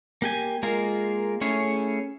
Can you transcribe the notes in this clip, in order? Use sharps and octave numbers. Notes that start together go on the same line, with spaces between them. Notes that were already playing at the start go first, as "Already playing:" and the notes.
A#3 G4 G#5
G#3 A#3 F4 G#4 A#4
A3 C#4 E4 G#4 C#5